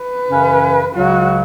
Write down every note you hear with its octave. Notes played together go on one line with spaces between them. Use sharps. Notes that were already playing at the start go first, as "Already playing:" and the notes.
Already playing: B4
F#2 C#3 E3 C#4
C#2 C#3 F#3 F#4